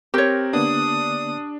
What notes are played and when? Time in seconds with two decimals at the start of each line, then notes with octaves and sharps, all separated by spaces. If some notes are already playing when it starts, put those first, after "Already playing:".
0.14 C4 G4 A#4 C#5
0.53 D3 A#3 B3 D4 D#6